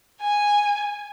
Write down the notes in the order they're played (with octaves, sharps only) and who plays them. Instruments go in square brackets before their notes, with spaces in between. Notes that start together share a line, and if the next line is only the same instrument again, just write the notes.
[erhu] G#5